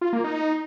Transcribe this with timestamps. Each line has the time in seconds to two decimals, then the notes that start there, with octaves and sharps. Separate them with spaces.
0.01 F4
0.13 A#3
0.24 D#4